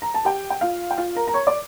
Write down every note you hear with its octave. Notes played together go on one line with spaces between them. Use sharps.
A#5
A5
G4 G5
G5
F4 F5
G5
F4 F5
A#4 A#5
A#5
C#5 C#6
D5 D6